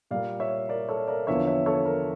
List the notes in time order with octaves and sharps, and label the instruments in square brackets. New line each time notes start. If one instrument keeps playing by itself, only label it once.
[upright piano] A#2 G3 A#3 D5 F5
C#5 E5
A#4 D5
A4 C#5
A#4 D5
E2 D3 F3 A#3 C#5 E5
C#5 E5
A4 C#5
A#4